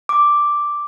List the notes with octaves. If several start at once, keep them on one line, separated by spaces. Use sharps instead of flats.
D6